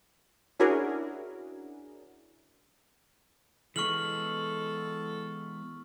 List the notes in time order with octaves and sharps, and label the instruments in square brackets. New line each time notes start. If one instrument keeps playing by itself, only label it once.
[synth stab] C#4 D4 E4 F#4 G#4 A#4
[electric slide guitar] E3 G#3 B3 [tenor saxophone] A4 [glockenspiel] C#6 F6 F#7